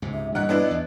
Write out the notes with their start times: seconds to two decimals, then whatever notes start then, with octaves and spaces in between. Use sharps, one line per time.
0.02 C#2 G#2 C3
0.14 E5
0.35 G2 A#2 E3 D#5 F#5 F#6
0.49 B3 D4 E4
0.71 E2